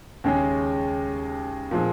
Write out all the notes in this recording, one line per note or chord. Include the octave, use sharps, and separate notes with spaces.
D#2 C#3 G#3 C#4 G#4
A#2 F3 G#3 C4